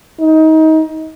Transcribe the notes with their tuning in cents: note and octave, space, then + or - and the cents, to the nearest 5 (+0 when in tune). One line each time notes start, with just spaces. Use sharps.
D#4 +25